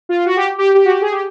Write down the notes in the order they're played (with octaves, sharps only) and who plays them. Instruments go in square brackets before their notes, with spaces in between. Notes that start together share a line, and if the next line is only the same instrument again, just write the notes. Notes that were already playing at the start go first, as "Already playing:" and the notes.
[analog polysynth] F4
F#4
G4
G4
G4
F#4
G4
G#4
G4